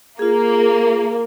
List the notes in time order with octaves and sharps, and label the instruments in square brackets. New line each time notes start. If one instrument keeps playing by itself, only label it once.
[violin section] A#3 [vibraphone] F4 G#4